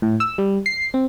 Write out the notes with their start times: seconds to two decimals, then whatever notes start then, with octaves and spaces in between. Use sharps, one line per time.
0.02 A2
0.20 E6
0.38 G3
0.66 C7
0.94 C4